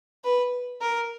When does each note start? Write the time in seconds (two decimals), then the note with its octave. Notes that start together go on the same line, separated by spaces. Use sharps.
0.24 B4
0.81 A#4